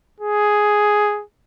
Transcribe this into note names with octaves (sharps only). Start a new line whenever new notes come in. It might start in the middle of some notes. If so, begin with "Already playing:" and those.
G#4